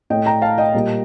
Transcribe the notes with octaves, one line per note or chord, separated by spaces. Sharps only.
A2 A3 D#5 G5
G5 A#5
F5 A5
D#5 G5
A#2 G3 A#3